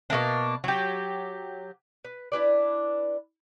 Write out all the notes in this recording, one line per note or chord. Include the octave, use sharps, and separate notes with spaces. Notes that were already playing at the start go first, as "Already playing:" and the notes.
B2 G#3 A#3 D4
F#3 G4
B4
D4 E4 B4 D5